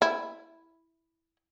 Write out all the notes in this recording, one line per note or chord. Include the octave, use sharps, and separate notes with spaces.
E4